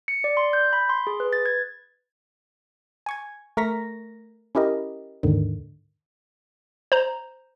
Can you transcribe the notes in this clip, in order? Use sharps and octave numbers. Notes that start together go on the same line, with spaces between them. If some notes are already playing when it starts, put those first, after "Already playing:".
C#7
D5
C6
G6
B5
C6
G#4
B4
A6
G#6
G#5 C#6 G#6
A3 A#4 A#5 C#6 A#6 B6
C#4 E4 G4 A#4 D#5
D#2 G#2 D3 D#3
C5 A#5